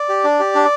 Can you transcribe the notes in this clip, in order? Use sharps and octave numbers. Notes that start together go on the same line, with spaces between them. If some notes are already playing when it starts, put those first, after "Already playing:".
Already playing: D5
G4
D4
G4
D4